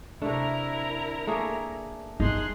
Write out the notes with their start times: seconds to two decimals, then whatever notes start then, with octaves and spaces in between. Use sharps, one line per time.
0.22 C3 A3 D4 E4 A#4 A#5
1.27 A3 A#3 G#4
2.20 G1 C#4 D#4 G#4 C6 F#6